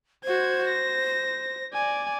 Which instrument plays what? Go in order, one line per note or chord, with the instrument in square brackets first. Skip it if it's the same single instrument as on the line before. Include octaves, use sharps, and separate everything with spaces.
[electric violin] F#4 G#6 [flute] C5
[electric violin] A#6
D5 G#5